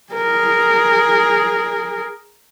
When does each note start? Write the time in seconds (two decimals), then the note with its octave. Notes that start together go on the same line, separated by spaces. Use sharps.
0.13 G#4 A#4